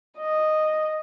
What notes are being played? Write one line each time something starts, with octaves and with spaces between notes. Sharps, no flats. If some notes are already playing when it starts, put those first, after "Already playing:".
D#5